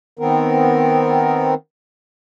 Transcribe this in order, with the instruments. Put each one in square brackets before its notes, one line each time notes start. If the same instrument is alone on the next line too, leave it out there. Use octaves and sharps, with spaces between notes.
[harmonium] D#3 B3 C4 A#4